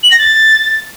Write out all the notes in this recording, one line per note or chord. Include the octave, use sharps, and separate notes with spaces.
F#7
A#6
A6